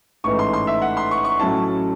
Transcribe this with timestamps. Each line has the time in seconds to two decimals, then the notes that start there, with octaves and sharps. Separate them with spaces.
0.24 A1 G#2 E3 A3 C#6
0.39 C6
0.53 C6
0.67 E5
0.82 F#5
0.97 C6
1.11 C#6
1.25 C#6
1.40 A2 F#3 C#4 E4 A5